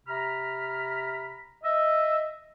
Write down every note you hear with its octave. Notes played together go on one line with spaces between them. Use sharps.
C3 A#5 B5 F6
D#5 E5